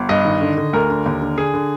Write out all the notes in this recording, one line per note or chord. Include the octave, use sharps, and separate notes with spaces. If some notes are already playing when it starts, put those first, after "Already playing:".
Already playing: G1
G2 D#5
D#3
D3
D3
D2 A#4
D3
D#2
D3
D3 G#4
D3